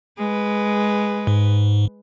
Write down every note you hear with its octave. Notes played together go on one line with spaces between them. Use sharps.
G#3 B4
G#2